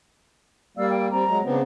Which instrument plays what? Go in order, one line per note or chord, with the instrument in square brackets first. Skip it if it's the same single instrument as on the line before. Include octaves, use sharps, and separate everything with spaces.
[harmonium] G3 A#3 [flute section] D5 F5 E6
[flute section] G5
[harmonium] G3 C4 [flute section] A#5
[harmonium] F#3 G#3
[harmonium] C#3 B3 C4 [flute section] D4